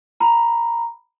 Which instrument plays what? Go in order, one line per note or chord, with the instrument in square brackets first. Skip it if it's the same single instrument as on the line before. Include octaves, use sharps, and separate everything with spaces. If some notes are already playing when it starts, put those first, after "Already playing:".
[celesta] A#5 B5